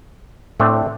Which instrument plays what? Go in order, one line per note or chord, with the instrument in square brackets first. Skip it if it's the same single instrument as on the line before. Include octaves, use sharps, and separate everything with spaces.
[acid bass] A2 [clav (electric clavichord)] A3 C4 D4